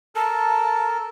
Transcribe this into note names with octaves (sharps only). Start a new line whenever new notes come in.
A4 A#4 A5